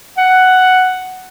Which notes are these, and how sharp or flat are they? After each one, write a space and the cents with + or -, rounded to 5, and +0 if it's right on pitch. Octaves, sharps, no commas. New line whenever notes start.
F#5 +5